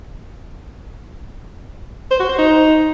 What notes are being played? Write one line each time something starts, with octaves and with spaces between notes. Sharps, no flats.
C5
F#4
C5
D#4